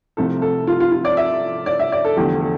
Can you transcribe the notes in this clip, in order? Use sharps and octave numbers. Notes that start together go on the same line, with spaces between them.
C2 C3 F3 A3 A4
A4
F4
F4
F4
D5
E5
D5
E5
D5
A4
E2 D3 F3 A3 G4
A4